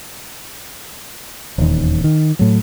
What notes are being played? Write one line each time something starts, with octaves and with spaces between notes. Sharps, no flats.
D#1 E2 D#3
D#3
A2 F#3